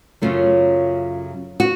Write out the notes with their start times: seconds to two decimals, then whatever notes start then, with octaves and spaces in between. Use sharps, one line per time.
0.22 F#2 C#3 F#3 A3 F4
1.60 F#4